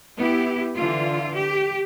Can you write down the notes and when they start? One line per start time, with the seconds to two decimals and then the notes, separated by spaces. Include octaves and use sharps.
0.16 B3 E4 G4
0.76 D3 E3 F4
1.36 G4